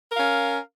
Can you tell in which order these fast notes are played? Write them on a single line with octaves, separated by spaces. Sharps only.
A#4 F5 C#4